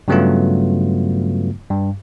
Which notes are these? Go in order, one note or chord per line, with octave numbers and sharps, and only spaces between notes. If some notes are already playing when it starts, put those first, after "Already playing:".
G2 C#3 F#3 A3 B3 F4
G2